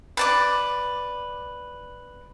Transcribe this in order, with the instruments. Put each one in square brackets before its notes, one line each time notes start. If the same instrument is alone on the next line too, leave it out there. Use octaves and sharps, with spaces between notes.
[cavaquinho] B4 D5 D6